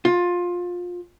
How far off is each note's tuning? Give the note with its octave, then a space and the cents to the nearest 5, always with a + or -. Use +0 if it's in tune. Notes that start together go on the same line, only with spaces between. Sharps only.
F4 +20